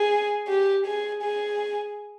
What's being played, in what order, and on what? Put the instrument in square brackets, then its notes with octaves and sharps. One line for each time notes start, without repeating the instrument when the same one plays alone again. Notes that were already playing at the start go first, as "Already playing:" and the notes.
Already playing: [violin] G#4
G4
G#4
G#4